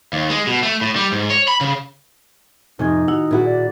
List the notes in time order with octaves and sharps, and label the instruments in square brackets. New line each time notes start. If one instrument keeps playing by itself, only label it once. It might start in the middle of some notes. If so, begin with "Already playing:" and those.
[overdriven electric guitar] D#2
G#3
B2
A3
A2
G3
G#2
C#5
B5
C#3
[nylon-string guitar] F2 C3 [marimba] A2 G#5 G#6 [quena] D#4
[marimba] D#3 E4 F#4 [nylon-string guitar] F#5
[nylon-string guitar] A#2 E4 F#4 [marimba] G#4
[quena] D5